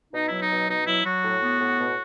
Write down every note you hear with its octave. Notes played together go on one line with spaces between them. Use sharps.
B2 D#4
F#3 E4
D#4
B2
B2 D#4
F#3 E4
F#3 F#4
A2
B3
A2
B2